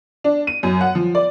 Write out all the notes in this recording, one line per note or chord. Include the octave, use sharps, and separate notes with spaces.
D4
D#7
F#2
F#5
F3
D5